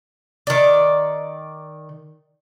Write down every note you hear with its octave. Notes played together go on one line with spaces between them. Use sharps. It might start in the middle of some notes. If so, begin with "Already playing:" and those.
D#3 D5